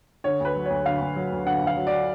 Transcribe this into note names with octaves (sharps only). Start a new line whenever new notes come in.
D3 C#5
D2 B4
F#3
D2 C#5
D3 F5
D2
F#3
D2
D3 F#5
D2
F5
F#3
D5